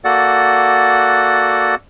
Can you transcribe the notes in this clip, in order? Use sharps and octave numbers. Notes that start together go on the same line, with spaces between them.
A#3 F#4 A4 D5 F#5